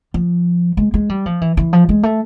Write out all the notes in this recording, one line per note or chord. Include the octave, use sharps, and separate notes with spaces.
F3
G#3
G#3
G3
F3
E3
E3
F3
G#3
A3